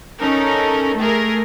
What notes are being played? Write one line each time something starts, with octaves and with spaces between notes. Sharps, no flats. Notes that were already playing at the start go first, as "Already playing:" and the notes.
C#4 D#4 A4 A#4
A3 G#4 A#4